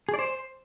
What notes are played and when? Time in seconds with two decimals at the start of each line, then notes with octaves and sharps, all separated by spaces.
0.09 G#4
0.14 D5
0.19 C5